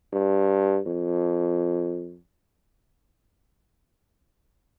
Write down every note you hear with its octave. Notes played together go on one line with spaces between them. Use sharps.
G2
F2